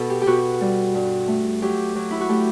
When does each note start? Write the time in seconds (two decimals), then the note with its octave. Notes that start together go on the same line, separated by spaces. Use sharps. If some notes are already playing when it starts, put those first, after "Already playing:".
Already playing: B2 A4
0.10 G4
0.22 G4
0.27 B2 F#4
0.61 G3
0.95 G2
1.28 A3
1.62 F#3 G4
1.95 F#3
2.11 E4
2.21 F#4
2.29 A3 G4